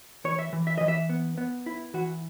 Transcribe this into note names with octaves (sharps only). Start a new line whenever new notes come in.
E3 C#5
E5
E3
E5
E3 D#5
E5
B3
B3
E4
E3 F#4